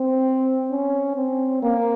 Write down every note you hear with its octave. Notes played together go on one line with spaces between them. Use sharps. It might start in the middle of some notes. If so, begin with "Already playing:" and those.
Already playing: C4
C#4
C4
A#3